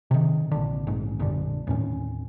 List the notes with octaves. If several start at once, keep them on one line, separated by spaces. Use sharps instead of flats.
C3 D#3
A#1 D3
A#1 G#2
A#1 F#2 D3
D#2 A2 C#4